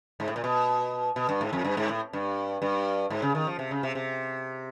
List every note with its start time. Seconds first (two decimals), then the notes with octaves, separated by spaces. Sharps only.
0.20 G#2
0.28 A2
0.36 A#2
0.44 B2
1.16 B2
1.29 G2
1.41 G#2
1.53 F2
1.64 G2
1.77 G#2
1.89 A2
2.13 G2
2.62 G2
3.10 G#2
3.22 C#3
3.35 D#3
3.47 F3
3.59 C3
3.71 C#3
3.83 C3
3.95 C3